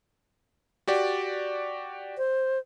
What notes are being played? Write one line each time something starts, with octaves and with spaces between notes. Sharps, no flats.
F#4 G4 D5
C5